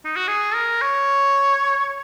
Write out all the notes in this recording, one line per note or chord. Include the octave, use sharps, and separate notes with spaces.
D#4
F#4
G#4
A#4
C#5